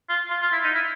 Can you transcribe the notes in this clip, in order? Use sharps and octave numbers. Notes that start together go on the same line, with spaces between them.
F4
F4
F4
E4
D#4
E4